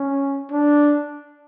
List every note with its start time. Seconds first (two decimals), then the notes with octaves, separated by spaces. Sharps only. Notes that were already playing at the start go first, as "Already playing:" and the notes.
Already playing: C#4
0.52 D4